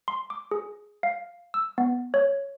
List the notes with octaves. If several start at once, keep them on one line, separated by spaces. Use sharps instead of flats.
C6
D6
G#4
F5
E6
B3
C#5